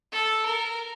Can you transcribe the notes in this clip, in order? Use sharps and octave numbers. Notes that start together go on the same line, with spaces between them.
A4
A#4